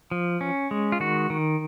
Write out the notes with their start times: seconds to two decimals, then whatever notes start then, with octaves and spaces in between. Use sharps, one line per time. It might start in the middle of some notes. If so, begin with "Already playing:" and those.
0.11 F3
0.41 C#4
0.71 G#3
0.92 F4
1.00 D#3 F#4
1.30 D#3